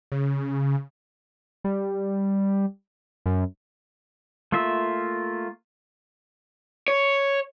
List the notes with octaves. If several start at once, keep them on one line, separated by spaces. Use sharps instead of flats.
C#3
G3
F#2
A3 A#3 F4 E5
C#5